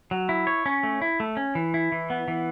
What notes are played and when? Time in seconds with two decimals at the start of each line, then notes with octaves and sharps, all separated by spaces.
0.11 F#3
0.29 E4
0.47 C#5
0.66 C#4
0.83 A3
1.02 E4
1.20 A3
1.37 C#4
1.55 E3
1.74 E4
1.92 E3
2.10 B3
2.28 E3